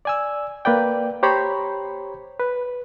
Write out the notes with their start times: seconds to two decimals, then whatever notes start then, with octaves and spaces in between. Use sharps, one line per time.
0.05 D5 G#5 E6
0.65 A#3 B4 D5 G5
1.23 G4 C5 C#5 A#5 B5
2.40 B4